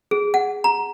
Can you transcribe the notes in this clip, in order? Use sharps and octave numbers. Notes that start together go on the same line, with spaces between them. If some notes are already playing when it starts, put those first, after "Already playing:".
G#4
F#5
A#5